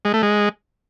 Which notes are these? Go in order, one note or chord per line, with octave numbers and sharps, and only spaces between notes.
G#3
A3
G#3